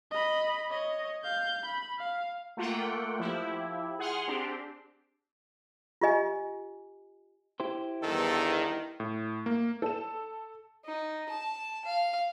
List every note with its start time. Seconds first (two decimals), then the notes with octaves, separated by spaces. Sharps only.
0.11 D#5 B5
0.70 C#5 D#5
1.24 F5 G6
1.66 B5
1.99 F5
2.57 A3 A#3 F4 F#5 G5
3.20 F3 E4 G4
3.99 G#4 F#5 C6 F6
4.28 C4 D4 G4 C6
6.02 F4 G4 D#5 G#5
7.60 E4 G4 C5
8.03 E2 G2 D#3 A4
9.00 A2
9.46 A#3
9.82 A4 E7
10.85 D#4
11.29 A5
11.85 F5